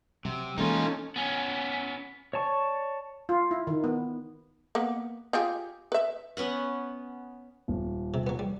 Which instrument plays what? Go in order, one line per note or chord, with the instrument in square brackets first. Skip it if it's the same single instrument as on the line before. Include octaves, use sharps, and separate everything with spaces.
[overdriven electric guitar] C3 [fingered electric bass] F#3
[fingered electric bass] E3 G#3 A#3 [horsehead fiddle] C#4 A4 [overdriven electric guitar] D#4 F4
[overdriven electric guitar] B3 C#4
[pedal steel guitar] C#5 D5 A5 C#6
[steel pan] F4
E4
D#3
B3
[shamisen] A#3 B3
F4 G4 G#4
B4 E5
[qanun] B3 C#4 B4 F#5
[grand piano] D#1
[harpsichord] C3
F#3 B3
G3